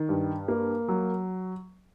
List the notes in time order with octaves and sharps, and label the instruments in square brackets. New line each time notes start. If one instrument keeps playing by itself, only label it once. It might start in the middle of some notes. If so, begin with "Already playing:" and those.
Already playing: [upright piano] D#3
G2
A#3
F#3